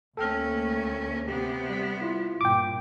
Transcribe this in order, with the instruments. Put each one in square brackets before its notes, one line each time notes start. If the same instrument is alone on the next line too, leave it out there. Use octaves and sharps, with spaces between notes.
[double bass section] D2 A#3 [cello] A3 C#4 [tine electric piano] A4 G5 F6
[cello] C3 B3 [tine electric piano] G4
[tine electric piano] G3 B6
E4 F4
[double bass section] G1 A#2 [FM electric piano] G5 D6